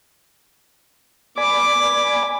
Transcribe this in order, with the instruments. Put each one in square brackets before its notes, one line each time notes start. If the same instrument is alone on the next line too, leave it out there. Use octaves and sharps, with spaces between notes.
[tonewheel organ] D5 G#5 B5 [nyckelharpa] D6